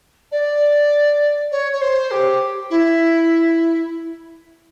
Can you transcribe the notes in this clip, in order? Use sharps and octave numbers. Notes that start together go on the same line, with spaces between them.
D5
C#5
C#5
C5
G4
E4